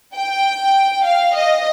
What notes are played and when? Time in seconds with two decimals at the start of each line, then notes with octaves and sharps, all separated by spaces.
0.15 G5
1.06 F5
1.36 D#5